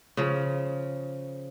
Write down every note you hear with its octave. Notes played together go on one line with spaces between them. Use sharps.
C#3 F3